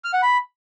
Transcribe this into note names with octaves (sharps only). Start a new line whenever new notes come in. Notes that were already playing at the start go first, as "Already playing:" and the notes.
F6
F#5
B5